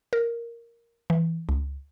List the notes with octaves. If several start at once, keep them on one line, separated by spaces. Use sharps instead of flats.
A#4
E3
C#2